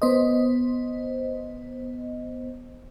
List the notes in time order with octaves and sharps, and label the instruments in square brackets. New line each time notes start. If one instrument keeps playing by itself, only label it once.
[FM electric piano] B3 C5 D#5